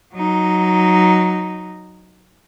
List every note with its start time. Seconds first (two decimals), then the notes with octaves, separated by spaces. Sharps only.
0.14 F#3 D#4